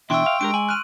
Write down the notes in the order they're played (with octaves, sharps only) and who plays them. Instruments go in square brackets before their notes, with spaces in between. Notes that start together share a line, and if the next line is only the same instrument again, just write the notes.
[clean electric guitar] B2 E3 D4 [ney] E5 [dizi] G5 [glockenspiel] C6 C#6 E6
[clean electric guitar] F5
[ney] G#3 [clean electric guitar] D4 G4 A#4 [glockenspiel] D7
[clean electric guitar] G#5 [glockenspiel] F#7
[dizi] F6 [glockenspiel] F#6 D#7